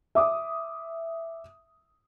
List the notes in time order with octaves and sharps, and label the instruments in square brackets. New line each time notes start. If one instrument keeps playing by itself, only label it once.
[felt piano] E5 D6 D#6